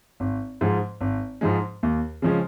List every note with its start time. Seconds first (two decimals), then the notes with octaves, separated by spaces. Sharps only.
0.20 G#1
0.61 G#2 F3 G#3
1.01 G#1
1.41 G#2 F3 G#3
1.83 D#2
2.22 C#3 F3 G#3 C#4